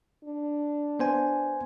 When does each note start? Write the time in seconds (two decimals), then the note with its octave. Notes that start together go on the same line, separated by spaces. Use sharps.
0.25 D4
1.00 B3 C5 G#5